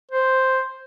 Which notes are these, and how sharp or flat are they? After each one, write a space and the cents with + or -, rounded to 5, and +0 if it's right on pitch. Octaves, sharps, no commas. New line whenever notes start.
C5 +0